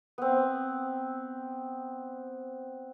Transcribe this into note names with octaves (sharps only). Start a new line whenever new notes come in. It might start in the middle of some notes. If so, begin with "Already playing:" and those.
B3 C4